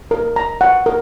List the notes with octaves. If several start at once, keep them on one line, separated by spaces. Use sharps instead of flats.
A#4
A#5
F#5
A#4